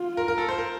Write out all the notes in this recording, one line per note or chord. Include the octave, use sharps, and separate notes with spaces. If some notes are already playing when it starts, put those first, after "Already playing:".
Already playing: F4
A#4
A#4
A4
C5
A#4